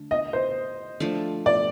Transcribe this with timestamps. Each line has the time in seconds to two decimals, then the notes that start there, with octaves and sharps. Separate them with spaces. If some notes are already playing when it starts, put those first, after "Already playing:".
Already playing: D3 A3 D4
0.11 D#5
0.33 C5
1.00 F3 A3 D4
1.46 D5